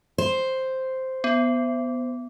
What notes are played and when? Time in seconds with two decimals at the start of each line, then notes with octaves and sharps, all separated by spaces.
0.18 C5
1.24 B3